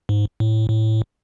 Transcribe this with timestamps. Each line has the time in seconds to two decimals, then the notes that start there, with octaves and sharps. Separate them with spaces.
0.09 G#2
0.40 A2
0.70 A2